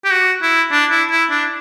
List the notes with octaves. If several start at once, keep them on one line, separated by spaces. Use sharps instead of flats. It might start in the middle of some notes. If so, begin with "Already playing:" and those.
G4
F#4
E4
D4
E4
E4
D4